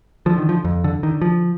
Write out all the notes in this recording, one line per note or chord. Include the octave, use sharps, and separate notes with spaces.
D3 F3
D#3
F3
F2
D3
D3 D#3
F3